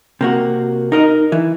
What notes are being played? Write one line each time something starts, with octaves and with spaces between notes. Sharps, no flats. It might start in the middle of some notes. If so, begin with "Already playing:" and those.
C3 A#3 F#4
D#4 A#4 D#5
E3